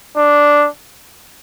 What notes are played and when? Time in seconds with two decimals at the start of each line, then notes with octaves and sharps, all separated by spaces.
0.17 D4